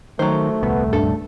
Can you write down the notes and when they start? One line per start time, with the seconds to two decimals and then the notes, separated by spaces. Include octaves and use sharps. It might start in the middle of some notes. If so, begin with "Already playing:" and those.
0.19 D#3 F#3 A3 C5
0.63 D#1 C2 B3
0.93 G2 A4